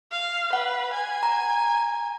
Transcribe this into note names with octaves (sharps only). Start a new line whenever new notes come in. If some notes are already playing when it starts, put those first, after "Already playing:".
F5
B4 F#5
G#5
A#5